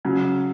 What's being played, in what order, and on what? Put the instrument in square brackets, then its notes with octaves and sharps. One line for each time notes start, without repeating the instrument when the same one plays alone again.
[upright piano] C#3 F#3